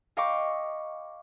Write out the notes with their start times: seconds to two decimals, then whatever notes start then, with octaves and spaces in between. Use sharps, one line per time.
0.17 D#5 F5 G5 B5 C#6 D6